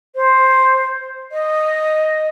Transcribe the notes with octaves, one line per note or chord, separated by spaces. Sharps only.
C5
D#5